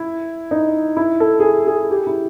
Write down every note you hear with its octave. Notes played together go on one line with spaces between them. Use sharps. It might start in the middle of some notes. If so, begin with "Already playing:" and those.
Already playing: E4
D#4
E4
A4
G#4
A4
G#4
G4
E4